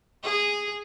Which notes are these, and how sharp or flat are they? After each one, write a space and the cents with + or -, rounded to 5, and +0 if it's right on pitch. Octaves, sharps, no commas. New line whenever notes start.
G#4 -10